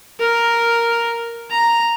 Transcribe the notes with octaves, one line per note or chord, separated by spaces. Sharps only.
A#4
A#5